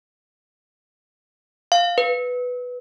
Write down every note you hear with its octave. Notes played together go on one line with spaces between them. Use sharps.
F5
B4